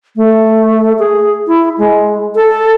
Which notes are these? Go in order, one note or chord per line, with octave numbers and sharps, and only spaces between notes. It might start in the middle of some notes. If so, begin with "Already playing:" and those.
A3
G#4
E4
G#3
A4